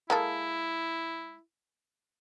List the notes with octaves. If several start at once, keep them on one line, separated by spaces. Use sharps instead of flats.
G#3 A#3 E4 A4